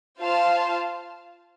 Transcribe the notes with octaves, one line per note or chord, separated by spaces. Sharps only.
F4 C5 F5 A5